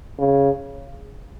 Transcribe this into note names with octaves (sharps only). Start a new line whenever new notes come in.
C#3